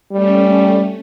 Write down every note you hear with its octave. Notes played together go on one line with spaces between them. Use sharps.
G3 A3 C#4